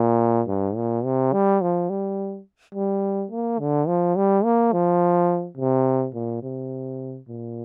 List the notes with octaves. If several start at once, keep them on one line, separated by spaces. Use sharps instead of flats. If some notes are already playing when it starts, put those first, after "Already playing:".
Already playing: A#2
G2
A#2
C3
G3
F3
G3
G3
A#3
D3
F3
G3
A#3
F3
C3
A#2
C3
A#2